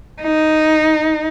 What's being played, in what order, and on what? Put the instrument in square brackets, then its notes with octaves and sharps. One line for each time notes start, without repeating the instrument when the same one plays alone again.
[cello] D#4